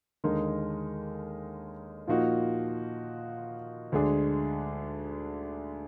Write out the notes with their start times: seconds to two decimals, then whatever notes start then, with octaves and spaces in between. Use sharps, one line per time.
0.24 D#2 D3 G#3 D#4 A#4
2.07 A#2 F3 A#3 D#4 F#4
3.92 D2 D3 G#3 D4 G#4